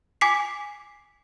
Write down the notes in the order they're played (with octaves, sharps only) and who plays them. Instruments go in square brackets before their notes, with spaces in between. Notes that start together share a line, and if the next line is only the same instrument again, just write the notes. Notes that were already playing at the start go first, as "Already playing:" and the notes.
[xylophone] G#5 D6 B6 C7